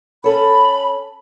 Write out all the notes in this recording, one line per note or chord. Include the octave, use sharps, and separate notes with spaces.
C#4 A4 C#5 B5